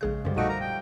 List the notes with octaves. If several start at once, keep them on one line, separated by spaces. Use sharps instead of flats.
A#1 C#3 G#3 G#4 F#6
F#2 D3 F3 G3 G4
A#1 A#2 A3 D#4 F#4 D7
A#4 A#5
G5